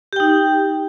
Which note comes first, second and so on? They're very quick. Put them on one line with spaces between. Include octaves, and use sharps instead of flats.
G4 G5 D#4